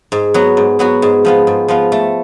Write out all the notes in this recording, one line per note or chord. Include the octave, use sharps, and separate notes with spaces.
G#2
F#3 B3 F#4
G#2
F#3 B3 F#4
G#2
F3 B3 F4
G#2
F3 B3 F4
A3